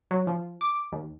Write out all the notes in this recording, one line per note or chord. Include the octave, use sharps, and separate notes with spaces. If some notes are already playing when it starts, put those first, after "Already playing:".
F#3
F3
D6
D#2